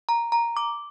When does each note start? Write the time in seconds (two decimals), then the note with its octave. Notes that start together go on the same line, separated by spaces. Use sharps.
0.09 A#5
0.32 A#5
0.57 D6